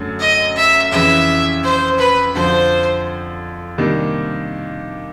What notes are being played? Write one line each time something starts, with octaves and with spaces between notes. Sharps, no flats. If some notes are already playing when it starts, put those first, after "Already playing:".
Already playing: F#2 D3 F#3 A3
D#5
E5
F2 C#3 E3 E5
C5
B4
F2 D3 F3 C5
C3 D#3 G3 A#3 D4